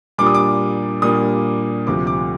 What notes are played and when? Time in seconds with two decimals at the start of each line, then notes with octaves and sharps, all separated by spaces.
0.18 A#2 G3 A#3 D4 D6
0.26 D#6
0.35 D6
1.02 A#2 G3 A#3 D4 D#6
1.86 D2 C3 F3 C4 D6
2.07 D6